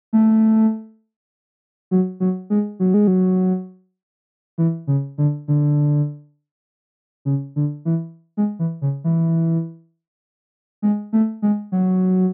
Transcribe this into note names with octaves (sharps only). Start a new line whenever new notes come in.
A3
F#3
F#3
G#3
F#3
G#3
F#3
E3
C#3
D3
D3
C#3
D3
E3
G#3
E3
C#3
E3
G#3
A3
G#3
F#3